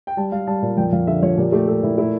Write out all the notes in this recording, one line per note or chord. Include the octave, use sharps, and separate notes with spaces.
G5
G3 A5
G3 F5
G3 A5
A#2
F2 G5
F2 F5
D3 E5
F3 C#5
A#2 G4
A3 G4
A3 A4
A#2 E4
A3 E4